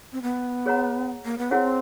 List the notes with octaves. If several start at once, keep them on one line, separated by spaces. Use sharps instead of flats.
C4
B3
G#4 C#5 F#5 A#5
A#3
B3
C4 D4 E4 G#4 C#5 F#5